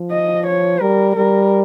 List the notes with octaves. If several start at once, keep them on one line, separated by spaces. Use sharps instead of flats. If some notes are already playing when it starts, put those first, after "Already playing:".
Already playing: F3
D#5
C#5
G3 A#4
G3 A#4